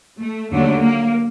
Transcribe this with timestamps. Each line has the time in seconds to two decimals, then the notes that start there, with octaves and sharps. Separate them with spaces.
0.21 A3
0.51 D#2 D3 F#3 A3
0.80 A#3